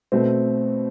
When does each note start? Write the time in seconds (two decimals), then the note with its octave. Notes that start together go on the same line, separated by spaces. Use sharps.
0.12 B2 A3 C4